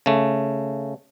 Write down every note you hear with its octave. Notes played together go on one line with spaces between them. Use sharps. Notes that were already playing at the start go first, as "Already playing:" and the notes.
C#3 A3